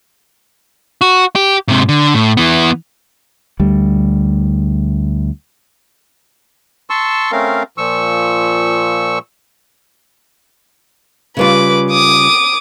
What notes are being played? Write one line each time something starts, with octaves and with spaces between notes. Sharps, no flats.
F#4
G4
G#2 C3
D3
A2
E3 B3
D2 G3
A5 C6 C#6 E6
A3 C4 C#4 A#4 F5
A#2 F3 C#6 E6
C#3 G3 F4 B4 D6
D6 D#6